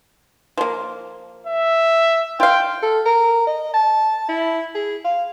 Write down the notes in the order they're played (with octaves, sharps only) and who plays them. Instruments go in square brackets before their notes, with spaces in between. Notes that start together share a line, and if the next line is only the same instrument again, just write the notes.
[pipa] F3 A#3
[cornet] E5
[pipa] F4 F5 [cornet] G5
[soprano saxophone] A4
A#4
D#5
A5
E4
G#4
F5